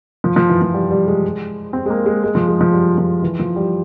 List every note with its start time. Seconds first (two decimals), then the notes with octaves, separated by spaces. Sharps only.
0.24 F3
0.36 F3
0.49 E3
0.62 F3
0.74 G3
0.91 G3
1.07 G#3
1.73 C4
1.86 G#3
1.90 A#3
2.06 G#3
2.24 G#3
2.35 F3
2.48 G#3
2.61 F3
2.73 G3
2.98 F3
3.22 E3
3.39 F3
3.56 G3